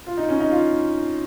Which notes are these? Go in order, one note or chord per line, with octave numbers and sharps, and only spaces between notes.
F4
D#4
C#4
D#4
F4